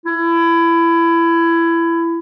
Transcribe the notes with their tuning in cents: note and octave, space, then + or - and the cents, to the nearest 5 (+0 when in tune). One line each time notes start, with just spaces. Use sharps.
E4 +20